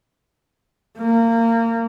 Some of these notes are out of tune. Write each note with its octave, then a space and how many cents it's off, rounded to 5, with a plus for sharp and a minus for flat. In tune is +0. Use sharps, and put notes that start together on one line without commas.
A#3 -25